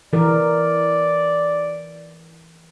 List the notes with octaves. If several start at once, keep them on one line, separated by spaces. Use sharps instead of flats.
E3 A#4 D5